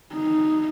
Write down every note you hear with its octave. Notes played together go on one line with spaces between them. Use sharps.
D#4